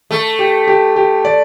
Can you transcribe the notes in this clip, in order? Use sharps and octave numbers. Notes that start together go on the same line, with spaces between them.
A3
G4
G4
G4
D5